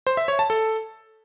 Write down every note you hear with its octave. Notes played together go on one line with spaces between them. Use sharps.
C5
E5
C#5
A5
A4